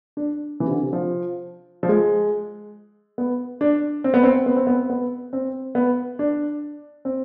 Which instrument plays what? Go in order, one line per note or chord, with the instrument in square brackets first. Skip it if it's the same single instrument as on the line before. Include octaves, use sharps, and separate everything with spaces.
[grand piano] D4
E3
C3
D3
C3
F3
F3
G#3
B3
D4
C4
B3
C4
B3
C4
B3
B3
C4
B3
D4
C4